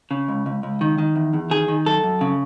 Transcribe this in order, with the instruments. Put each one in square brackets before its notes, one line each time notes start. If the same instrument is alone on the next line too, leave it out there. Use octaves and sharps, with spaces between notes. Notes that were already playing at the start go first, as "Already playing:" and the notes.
[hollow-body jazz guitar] C#3
C#2
C#2
C#2
D#3
D#3
E2
E2
D#3 G#4
D#3
F#2 A4
F#2
C#3